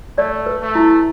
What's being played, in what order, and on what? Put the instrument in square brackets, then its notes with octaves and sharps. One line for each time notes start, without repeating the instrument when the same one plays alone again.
[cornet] A3 [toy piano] D5
[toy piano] B4
[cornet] A3
[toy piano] E4